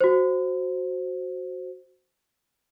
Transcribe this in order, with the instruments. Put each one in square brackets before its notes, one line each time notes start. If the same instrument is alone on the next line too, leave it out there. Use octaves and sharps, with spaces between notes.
[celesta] F#4 C5